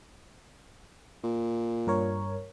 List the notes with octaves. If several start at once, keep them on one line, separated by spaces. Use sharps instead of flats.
A#2
G2 A#4 C#5